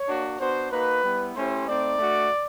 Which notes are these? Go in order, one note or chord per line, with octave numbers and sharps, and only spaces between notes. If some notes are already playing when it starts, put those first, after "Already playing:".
Already playing: C#5
A#3 D4 F#4
B3 D4 F#4 C5
A#3 D#4 F#4 B4
G3 B3 E4
A3 C#4 E4 G4 C5
A3 C4 D#4 D5
A3 D4 F#4